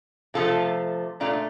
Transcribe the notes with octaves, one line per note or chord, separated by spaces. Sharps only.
C3 F3 A3 F4 A4
A#2 A3 D4 F4